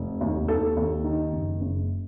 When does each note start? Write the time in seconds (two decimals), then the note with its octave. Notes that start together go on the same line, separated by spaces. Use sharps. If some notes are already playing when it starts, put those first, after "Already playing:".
Already playing: F1
0.21 D#2
0.48 D#2 A4
0.77 D#2
1.04 D#3
1.32 F#1
1.60 F#1